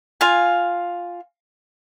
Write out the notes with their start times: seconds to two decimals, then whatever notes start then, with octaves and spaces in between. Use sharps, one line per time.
0.21 F4 F5 G#5